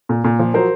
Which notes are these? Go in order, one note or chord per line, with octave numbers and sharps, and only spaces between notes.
A#2
A#2
F3
F#3 A#4 C5